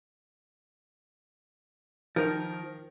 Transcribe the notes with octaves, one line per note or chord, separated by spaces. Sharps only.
D#3 F3 A#4